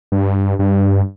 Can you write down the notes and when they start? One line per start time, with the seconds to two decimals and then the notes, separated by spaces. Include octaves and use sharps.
0.12 G2
0.59 G2